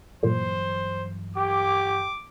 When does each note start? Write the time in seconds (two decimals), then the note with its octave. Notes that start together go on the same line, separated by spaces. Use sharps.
0.23 G2 A#2 E3 F#3 C5
1.37 G4 D6